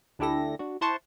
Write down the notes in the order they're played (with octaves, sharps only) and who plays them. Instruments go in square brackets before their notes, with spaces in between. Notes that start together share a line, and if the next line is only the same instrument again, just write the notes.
[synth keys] D2 D4 E4 G4 A4 A#6
D4 F#4
E4 C5 F#5 A5 C6 C#6